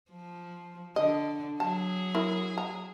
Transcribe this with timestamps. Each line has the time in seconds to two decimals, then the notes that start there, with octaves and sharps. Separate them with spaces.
0.11 F3
0.96 D3 D#5
1.60 F#3 G#4 A5
2.15 E4 A#4
2.58 A#5